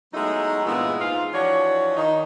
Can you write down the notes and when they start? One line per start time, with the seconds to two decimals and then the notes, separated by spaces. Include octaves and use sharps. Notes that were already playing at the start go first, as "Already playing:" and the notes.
0.14 F#3 G#3 A3 B3 D#4 E4
0.65 G2 A#2 E3 G#3 B3 E4
1.00 G#2 F4
1.33 E3 F3 D4 F#4 C#5
1.96 D#3 D#4